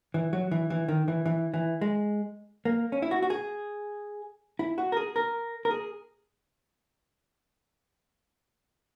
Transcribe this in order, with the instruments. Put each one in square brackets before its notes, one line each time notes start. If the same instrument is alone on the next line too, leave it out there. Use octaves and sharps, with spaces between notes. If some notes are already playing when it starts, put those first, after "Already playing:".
[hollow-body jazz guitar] E3
F#3
E3
E3
D#3
E3
E3
E3
G#3
A#3
C#4
E4
F#4
F#4
G#4
E4
F#4
A#4
G#4
A#4
A#4
G#4